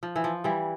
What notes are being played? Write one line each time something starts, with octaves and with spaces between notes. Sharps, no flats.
F3
E3
F3
E3 G3